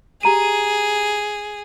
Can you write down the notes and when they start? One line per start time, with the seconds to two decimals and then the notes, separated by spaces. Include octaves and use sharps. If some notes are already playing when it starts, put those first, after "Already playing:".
0.23 G4 G#4 A#5 D#7